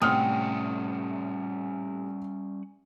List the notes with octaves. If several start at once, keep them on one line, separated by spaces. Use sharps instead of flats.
A2 C3 G3 C4 C#4 F#5 D#6 F6